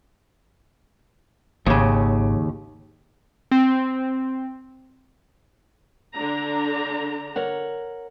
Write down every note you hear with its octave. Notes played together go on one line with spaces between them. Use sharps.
G#1 D#2 C#3
C4
D3 D4 A#5
A#4 C#5 F#5